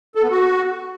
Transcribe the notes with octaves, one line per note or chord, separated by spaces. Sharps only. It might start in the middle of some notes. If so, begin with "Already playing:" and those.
A4
B3
F#4